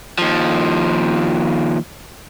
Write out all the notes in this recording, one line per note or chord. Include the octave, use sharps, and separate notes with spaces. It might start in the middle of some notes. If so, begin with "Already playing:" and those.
D#2 F3